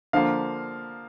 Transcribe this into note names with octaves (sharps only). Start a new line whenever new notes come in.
D3 F3 A#3 F5